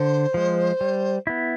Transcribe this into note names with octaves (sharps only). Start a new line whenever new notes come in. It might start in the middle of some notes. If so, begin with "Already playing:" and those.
Already playing: D3 C5
F3 G#3
G3
B3 E4